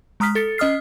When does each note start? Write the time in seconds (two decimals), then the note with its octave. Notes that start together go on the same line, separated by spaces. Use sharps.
0.20 G#3 A#5 D#6 F6 B6
0.35 A4 A6 C#7
0.58 C#4 D#5 D#6 F6 C7